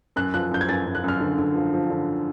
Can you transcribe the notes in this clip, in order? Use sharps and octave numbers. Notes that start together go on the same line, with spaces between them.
F#2 F#6
F3 F#6
F#2 G6
G#6
F#2 A6
F#2
F#6
F#2 F6
D3
D3
F3
F3
D3